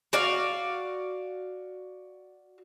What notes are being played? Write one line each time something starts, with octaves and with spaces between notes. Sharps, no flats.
F#4 D5 F5